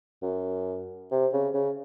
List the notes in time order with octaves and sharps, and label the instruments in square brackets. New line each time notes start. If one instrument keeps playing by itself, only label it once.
[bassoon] F#2
C3
C#3
C#3